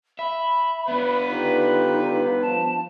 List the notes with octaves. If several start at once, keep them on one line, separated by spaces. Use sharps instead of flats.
E5 B5
B3 D4 B4
D3 D#4 F4 G4
F3 A5